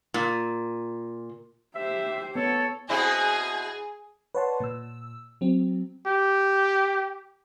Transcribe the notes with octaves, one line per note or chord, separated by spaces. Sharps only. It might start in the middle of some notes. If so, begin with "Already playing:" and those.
A#2
G4 C5 E5
B3 A4 C#5
B2 C4 E4 G#4
B4 C#5 D5 F#5 A5 C6
A#2 E6
F#3 C4
G4